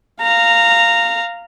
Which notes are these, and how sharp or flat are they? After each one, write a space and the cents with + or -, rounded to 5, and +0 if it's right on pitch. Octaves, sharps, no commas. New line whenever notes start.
F5 -5 A#5 -15